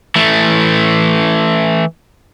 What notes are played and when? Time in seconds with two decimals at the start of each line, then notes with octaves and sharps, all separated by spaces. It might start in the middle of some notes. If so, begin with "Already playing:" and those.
0.16 E3 A3